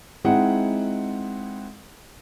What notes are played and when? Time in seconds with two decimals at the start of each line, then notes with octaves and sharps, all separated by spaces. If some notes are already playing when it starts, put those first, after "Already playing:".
0.24 G#3 C4 D#4 E4 G#4 F#5